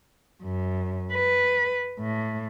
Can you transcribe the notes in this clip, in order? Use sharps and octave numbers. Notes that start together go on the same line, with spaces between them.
F#2
B4
A2